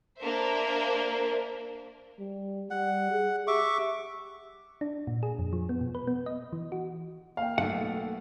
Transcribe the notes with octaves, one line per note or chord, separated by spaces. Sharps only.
A#3 D4 A#4 C5 E5
G3
G3 F#5
G#4
G4 E5 C#6 D6
D4
A#2
G#4
F2
F3
B3
B2
B4
B3
D#5
E3
F#4
A#3 F5 G5
B1 A3 F#5